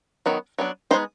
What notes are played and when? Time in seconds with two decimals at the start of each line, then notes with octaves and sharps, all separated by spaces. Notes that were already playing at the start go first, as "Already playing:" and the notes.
0.26 D#3 F#3 B3
0.58 F#3 B3 D4
0.91 G#3 B3 D#4 C5